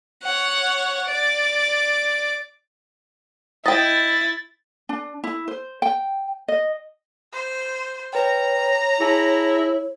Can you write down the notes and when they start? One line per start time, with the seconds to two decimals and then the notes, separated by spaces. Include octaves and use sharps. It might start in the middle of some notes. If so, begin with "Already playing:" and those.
0.23 C#5 F#5
1.06 D5
3.66 E4 D#5 G5 A6
4.89 D4
5.24 E4
5.48 C5
5.82 G5
6.48 D#5
7.33 C5
8.13 B4 C#5 G5 A#5
9.00 E4 G#4 A5